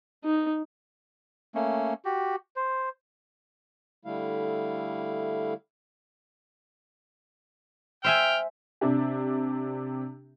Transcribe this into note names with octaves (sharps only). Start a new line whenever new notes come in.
D#4
A3 A#3 C#4
F#4 G4
C5
D3 G3 A3 E4 F5
C5 E5 G5 G#5 F6
C3 D4 G4